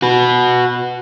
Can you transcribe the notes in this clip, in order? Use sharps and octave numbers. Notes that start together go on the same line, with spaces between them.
F#4 B4